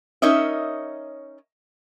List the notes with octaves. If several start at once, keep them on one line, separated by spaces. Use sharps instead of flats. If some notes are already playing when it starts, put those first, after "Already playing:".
C#4 D#4 A#4 C#5 D#5 E5